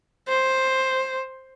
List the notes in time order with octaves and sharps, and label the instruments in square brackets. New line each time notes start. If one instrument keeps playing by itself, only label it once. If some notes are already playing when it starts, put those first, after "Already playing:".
[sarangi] C5